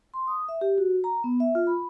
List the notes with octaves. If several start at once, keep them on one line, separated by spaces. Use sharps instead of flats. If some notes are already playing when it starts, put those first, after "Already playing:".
C6
D#6
E5
G4
F#4
A#5
B3
E5
F4
B5